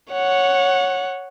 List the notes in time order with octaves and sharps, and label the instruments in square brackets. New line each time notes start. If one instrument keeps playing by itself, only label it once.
[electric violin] C#5 F#5